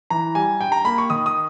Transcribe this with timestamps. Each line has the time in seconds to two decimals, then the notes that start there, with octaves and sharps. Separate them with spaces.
0.10 E3 A#5
0.35 G3 G#5
0.60 G2 G5
0.72 A#5
0.84 A#3 B5
0.98 C#6
1.10 D#3 D#6
1.26 D#6